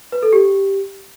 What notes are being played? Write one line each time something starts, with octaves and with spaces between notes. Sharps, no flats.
B4
A4
G4